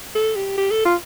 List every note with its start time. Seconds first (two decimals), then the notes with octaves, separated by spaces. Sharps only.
0.15 A4
0.36 G4
0.57 G4
0.71 A4
0.85 F4